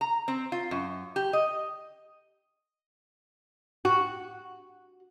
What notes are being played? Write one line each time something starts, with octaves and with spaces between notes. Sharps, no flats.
A#5
C4
F4
F#2
G4
D#5
F#4